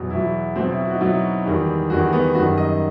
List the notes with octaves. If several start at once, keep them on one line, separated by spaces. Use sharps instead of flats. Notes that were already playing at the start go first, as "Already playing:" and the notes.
Already playing: E2 B2 F#3
E2 B2 F#3 E4
B2 F#3 C4
E4
F#4
D#4
B2 F#3 E4
E2 D#3 G3
E2 D#3 G3 F#4
B3
F#2 D#3 G3 F#4
D#5